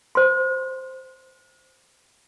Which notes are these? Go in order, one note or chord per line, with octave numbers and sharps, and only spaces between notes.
C5 C6